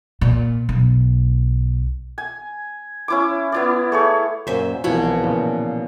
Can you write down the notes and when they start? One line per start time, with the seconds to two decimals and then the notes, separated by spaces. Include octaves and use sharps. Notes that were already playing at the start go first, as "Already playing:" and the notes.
0.21 A#2
0.69 B1
2.18 G#5
3.08 C#4 E4 D6
3.52 B3 E4 D5
3.92 A3 G#4 C#5
4.47 F#2 A#2 C5 E5 G#5
4.84 C2 B2 E3 F3 E4 C#5 B5
5.23 A#2 C#3